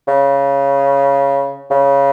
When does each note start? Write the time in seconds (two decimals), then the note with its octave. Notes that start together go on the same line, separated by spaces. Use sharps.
0.08 C#3
1.70 C#3